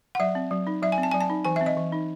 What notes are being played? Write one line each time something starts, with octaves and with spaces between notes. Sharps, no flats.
F#5
F#3 E5
C4
F#3
D#4
F#3 E5
G#5
C4
A5
F#3 G#5
A5
D#4
E3 G#5
E5
C4
D#5
E3
D#4